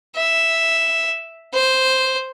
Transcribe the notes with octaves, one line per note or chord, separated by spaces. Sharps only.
E5
C5